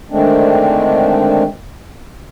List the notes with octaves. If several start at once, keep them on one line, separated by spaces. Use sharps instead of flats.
D3 D#3 G#3 A3 C4 D4